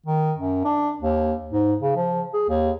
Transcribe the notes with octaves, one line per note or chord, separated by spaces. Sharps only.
D#3
F#2
D4
D#2
G#2
C#3
F3
G#4
D#2